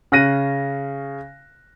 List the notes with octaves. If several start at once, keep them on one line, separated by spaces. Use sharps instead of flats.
C#3 F#6 A#6 D#7